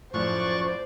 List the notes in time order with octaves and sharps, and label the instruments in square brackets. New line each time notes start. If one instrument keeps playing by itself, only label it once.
[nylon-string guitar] F#2 A2 F3 [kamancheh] C5 D5 [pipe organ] C#6 F#6 A6